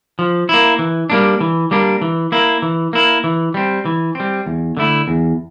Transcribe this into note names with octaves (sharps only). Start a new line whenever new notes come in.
F3
A#3 E4
E3
G3 A#3 D4
E3
G3 A#3 D4
E3
A#3 E4
E3
A#3 E4
E3
G3 C4
E3
G3 C4
E2
D3 A3 E4
E2